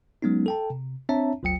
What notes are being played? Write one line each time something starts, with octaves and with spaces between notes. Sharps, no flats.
F#3 G#3 B3 C#4 D#4
A4 G5 A5
C3
C4 D4 C#5 E5 A5 A#5
G1 D2 F#3 G5 C#7